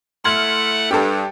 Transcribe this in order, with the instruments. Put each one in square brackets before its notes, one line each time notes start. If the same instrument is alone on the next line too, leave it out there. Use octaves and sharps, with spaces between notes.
[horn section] A3 E4 F#5 [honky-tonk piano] C6 F6 G#6
[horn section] G2 [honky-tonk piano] G4 A4